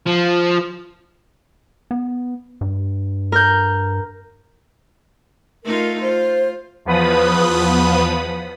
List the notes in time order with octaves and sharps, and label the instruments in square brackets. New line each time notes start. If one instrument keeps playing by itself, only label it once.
[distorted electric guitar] F3
[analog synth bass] B3
G2
[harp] A#4 G6
[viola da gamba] A3 D#4 F4 [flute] A#4
[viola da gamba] F4 [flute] C5
[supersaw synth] E2 F3 B3 B4 B5 D#6